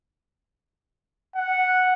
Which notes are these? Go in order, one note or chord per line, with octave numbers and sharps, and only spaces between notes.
F#5